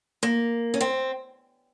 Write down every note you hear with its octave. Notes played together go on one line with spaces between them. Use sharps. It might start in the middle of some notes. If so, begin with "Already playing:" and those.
A#3
C#4
C4